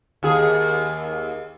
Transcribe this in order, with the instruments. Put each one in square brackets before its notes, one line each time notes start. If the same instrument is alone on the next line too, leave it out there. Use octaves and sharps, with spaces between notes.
[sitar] D#2 G#4